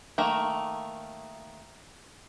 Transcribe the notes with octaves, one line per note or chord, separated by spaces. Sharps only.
D#3 A3 A#3 A#5